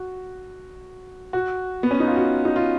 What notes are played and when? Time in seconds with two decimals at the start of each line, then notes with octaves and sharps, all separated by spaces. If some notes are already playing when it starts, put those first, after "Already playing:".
Already playing: F#4
1.33 F#4
1.83 B3
1.91 C#4
2.00 D#4
2.07 F4
2.16 F#4
2.45 D#4
2.56 F4